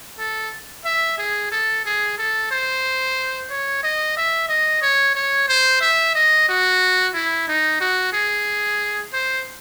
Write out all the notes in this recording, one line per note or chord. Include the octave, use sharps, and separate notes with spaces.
A4
E5
G#4
A4
G#4
A4
C5
C#5
D#5
E5
D#5
C#5
C#5
C5
E5
D#5
F#4
E4
D#4
F#4
G#4
C5